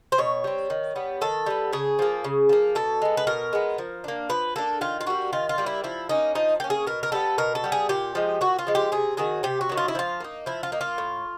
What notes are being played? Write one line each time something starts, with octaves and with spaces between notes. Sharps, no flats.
C5
B2 C#5
G3 C4
D#3
G3 B3
D#3 A4
G3 B3
C#3 G#4
F3 A#3
C#3
F3 A#3
B2 A4
G#3 B3
B4
B2 A#4
G#3 B3
F3
A#3 D4
F3 B4
A#3 D4 A4
D#3 F4
F4
G3 A#3 F#4
D#3 F4
F4
G3 A#3
E4
F3 E4
A#3 C#4 D#4
F3 D#4
A#3 C#4 G4
G#4
B2 A#4
A#4
G3 B3 A4
B2 A#4
A4
G3 B3
G#4
A#2 G4
F3 G#3
A#2 F#4
F4
F3 G#3
G4
C3 G#4
D#3 F#3 G#4
C3 G4
F#4
D#3 F#3
F4
E4
F3 F4
A#3 D#4
F3 E4
F4
A#3 D#4
F4
A2